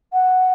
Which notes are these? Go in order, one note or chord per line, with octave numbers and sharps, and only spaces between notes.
F#5